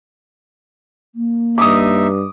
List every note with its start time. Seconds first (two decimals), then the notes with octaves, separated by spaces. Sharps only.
1.15 A#3
1.58 G2 D#4 E5 D6 D#6